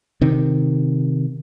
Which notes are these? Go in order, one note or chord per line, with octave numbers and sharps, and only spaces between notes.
C3 D#3